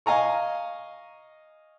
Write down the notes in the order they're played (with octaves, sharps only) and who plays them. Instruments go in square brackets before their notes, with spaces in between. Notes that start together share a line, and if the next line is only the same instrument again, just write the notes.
[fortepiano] D#5 F5 G#5 A#5 C#6